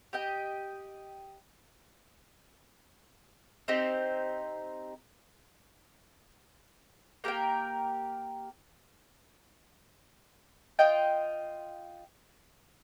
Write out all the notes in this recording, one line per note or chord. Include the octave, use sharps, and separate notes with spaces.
G4 D#5 G5
C4 D#4 G4 C5
A#3 G4 A#4 G5
F4 D#5 G5